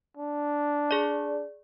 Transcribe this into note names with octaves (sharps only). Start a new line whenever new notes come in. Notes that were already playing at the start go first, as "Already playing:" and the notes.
D4
G#4 D5